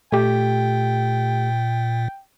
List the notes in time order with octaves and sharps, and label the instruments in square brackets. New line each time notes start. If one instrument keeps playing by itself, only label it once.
[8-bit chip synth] A#2 [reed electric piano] A3 G4 [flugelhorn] G5